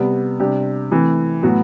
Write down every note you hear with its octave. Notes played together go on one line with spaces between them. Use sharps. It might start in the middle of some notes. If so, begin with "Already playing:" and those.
Already playing: C3 G3 B3
C3 G3 D4 G4
E3 A3 C4
A2 F#3 B3 F#4